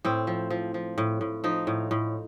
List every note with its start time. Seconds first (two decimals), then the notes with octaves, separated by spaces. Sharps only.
0.05 A2 C4
0.27 F3
0.50 F3
0.74 F3
0.98 A2
1.21 A2
1.44 F3 D#4
1.67 A2
1.91 A2